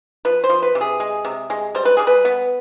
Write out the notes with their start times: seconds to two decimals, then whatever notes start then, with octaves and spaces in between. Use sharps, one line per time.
0.25 F3 B4
0.44 C5
0.49 F3
0.62 B4
0.75 C3
0.81 G#4
1.00 G#3
1.25 C3
1.50 G#3
1.75 G3 C5
1.85 B4
1.97 G3 G#4
2.07 B4
2.25 B3